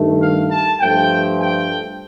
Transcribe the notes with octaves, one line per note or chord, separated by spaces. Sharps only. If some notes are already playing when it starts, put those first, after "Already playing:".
Already playing: G2 D#3 A3
F5
A5
G2 F3 A3 G5
G5